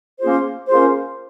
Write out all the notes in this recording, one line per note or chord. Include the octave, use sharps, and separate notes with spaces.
A#3 C#4 F4 G#4 C5
A#3 C#4 F4 G#4 C5